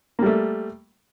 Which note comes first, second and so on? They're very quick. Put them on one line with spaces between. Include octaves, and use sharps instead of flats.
A#3 G3 A3